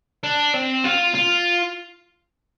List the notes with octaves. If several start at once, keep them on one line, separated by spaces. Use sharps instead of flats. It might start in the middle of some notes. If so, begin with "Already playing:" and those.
D4
C4
F4
F4